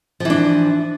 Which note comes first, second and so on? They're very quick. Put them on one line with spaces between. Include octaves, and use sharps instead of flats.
F3 E3 D4